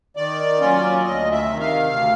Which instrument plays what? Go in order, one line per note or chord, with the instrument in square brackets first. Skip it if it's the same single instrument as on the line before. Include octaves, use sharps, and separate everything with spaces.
[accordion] D#3 D5
F#3 A#3 C#4 F4
D2 D#5
E5
C3 D#3
F5
D2